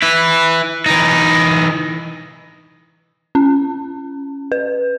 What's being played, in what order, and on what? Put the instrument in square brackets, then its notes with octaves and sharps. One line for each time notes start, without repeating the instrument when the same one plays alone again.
[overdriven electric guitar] E4 B4
E3 D#4
[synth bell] C#4
B4